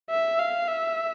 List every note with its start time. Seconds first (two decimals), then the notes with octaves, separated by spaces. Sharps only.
0.10 E5
0.39 F5
0.68 E5